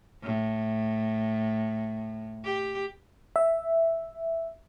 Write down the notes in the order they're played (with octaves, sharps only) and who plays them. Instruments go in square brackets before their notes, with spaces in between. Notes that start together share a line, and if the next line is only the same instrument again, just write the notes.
[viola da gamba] A2
G4
[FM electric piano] E5